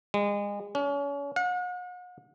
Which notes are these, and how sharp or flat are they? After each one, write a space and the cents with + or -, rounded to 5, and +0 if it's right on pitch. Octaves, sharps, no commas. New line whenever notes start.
G#3 -30
C#4 +35
F#5 -40